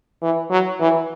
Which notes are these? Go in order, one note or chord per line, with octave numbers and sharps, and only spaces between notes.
E3
F#3
E3